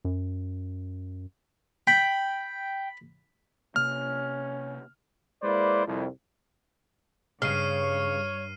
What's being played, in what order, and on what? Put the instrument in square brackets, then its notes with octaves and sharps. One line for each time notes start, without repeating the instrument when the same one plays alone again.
[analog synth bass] F#2
[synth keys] G5 [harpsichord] B5
[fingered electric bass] C3 A#3 [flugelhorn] C#4 [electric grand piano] F6
[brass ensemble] G#3 A#3 E4 B4 C5 D5
C2 F2
[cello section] G2 [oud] C#3 [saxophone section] C#5 [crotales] F6 C7 D#7